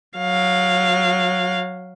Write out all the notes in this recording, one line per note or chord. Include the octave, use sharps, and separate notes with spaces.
F#3 F5